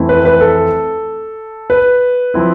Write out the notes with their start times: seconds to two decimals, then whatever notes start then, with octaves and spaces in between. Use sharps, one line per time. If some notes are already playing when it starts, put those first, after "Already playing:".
Already playing: F2 E3 A3 C4 E4
0.09 B4
0.25 B4
0.41 A4
1.70 B4
2.34 F3 C4 E4